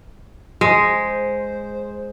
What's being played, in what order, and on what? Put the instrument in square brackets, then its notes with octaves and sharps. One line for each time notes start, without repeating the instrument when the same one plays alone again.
[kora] G#3 [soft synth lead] C5